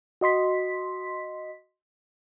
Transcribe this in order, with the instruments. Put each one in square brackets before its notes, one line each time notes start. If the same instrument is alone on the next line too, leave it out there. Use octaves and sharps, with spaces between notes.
[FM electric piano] F#4 D#5 C6 B6